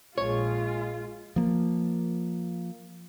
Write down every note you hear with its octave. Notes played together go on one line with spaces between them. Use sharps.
A#1 G#3 F4 C#5
F3 A#3